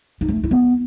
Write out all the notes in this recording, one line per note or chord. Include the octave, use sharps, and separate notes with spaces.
D#4
A3
F4
E4
B3